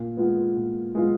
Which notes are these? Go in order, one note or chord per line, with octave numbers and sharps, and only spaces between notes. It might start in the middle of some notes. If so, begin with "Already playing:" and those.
Already playing: A#2
G#3 B3 F4
A#2
G#3 B3 F4